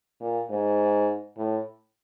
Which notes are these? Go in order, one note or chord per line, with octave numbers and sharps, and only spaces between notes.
A#2
G#2
A2